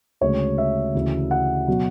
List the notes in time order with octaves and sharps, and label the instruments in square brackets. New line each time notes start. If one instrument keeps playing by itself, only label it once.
[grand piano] D2 C#3 G#3 C#5
E5
D2 C#3 E3
F#5
B2 F#3